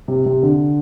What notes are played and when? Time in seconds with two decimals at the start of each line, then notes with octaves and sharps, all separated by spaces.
0.08 C3
0.26 C3
0.43 D3